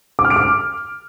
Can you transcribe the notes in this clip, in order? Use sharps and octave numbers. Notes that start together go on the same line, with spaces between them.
D6
F6
D7
D6